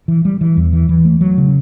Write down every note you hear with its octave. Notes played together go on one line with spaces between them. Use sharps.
E3
G3
E3
E2
E3
E3
A3
F#3
C#3